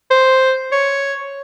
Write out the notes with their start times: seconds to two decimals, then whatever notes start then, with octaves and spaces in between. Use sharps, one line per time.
0.11 C5
0.72 C#5